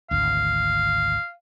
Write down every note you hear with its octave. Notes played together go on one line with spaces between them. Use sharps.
G#1 D2 F5